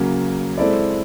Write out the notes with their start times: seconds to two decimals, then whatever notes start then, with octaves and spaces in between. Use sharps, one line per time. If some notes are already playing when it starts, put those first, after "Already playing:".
Already playing: C#3 F#3 A#3
0.58 G#3 C4 E4 A4 D5